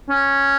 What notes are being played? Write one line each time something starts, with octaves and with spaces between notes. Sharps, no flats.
C#4